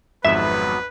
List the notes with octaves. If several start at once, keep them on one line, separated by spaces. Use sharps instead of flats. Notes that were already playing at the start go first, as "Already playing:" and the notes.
G#1 F2 G#2 F#3 B3 B4 E5